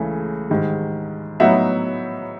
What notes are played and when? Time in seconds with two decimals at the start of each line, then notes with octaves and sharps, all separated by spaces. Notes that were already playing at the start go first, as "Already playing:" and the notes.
Already playing: C#2 C#3 E3 A3
0.50 G#2 D#3 G3
1.40 A2 F#3 B3 D#4 E5 F#5